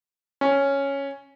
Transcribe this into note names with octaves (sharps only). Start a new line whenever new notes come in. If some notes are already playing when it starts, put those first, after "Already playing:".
C#4